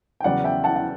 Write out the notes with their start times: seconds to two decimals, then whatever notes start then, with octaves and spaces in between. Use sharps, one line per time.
0.20 G5
0.24 E2 C#3 F#3 D5 F#5
0.44 E5 G5
0.64 F#5 A5
0.76 F#5